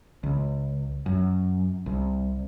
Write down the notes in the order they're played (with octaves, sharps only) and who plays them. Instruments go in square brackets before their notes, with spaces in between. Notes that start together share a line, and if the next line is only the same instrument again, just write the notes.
[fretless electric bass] C#2
F#2
C2